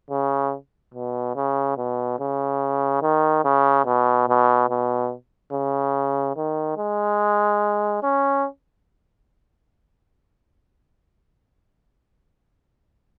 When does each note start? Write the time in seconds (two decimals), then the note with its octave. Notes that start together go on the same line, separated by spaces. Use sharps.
0.10 C#3
0.94 B2
1.36 C#3
1.77 B2
2.19 C#3
3.02 D#3
3.45 C#3
3.86 B2
4.28 B2
4.70 B2
5.52 C#3
6.36 D#3
6.77 G#3
8.03 C#4